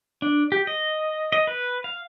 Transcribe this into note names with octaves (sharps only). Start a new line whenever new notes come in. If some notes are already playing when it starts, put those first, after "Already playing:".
D4
G4
D#5
D#5
B4
F5